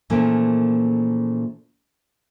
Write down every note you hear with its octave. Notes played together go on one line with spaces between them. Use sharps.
A#2 C#3 E3 F3 A3 A#3